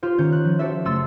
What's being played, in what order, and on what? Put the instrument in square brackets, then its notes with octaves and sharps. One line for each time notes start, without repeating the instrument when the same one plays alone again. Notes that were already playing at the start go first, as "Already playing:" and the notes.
[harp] F4 G4 C5
D#3 C#4 G6
F#6
F3
F#4 G4 A4 C5 E5
F#1 A3 C6 E6 A6